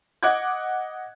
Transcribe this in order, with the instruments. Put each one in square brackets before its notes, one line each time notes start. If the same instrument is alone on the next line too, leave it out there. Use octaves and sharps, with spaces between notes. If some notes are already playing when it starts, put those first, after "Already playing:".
[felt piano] D#5 F#5 D6 F#6 G#6